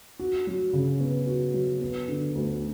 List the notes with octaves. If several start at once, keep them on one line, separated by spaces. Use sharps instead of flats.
F#4
F#3
C#3
B3
F#4
F#3
B3
D3
D2